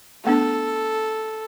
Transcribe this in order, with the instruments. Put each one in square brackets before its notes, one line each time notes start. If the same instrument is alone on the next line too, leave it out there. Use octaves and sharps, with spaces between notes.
[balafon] A3 B3 D4 [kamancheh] A4